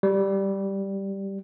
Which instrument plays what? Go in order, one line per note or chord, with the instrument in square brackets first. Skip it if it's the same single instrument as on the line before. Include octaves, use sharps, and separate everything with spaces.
[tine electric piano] G3